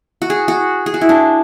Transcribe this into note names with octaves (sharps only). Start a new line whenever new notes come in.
F#4
G#4
F#4
G#4
F#4
E4
D4